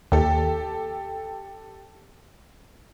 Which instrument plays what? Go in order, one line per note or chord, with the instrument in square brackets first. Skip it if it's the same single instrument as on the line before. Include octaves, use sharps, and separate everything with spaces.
[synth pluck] D#2 [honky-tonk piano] G4 A4